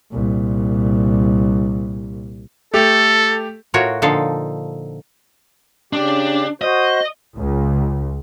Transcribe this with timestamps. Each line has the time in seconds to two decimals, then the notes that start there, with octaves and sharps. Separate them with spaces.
0.11 C2 A#2
2.74 A3 G4 A4
3.74 A2 F4 F#4 A#4 C#5
4.02 A#2 D3 F3 D#4 A4 F5
5.93 C#3 D4 G4
6.62 F#4 C5 D#5
7.36 C#2